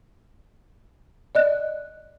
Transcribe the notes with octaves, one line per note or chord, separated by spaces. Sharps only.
D5 D#5 F#6